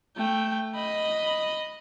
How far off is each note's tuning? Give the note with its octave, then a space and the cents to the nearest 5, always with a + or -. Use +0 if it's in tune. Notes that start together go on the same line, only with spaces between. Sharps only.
A3 +0 G5 +0
D#5 +0 B5 +0